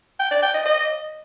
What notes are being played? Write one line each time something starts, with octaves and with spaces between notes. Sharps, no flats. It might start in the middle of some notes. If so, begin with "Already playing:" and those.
G5
D5
G5
D#5
D#5